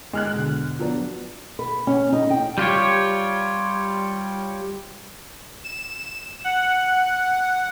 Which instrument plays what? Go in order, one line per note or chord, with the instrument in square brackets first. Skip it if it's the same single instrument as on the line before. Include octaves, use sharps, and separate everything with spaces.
[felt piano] G#3 F6 F#6
E1 D3
F3 F#3 B3 D4
[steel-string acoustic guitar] B4
C#4
D#4
G5
[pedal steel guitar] G3 F4 G4 C#5
[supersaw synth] E7
F#5